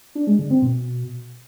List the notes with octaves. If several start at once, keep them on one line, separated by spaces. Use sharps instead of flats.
D4
G#3
D3
C4
B2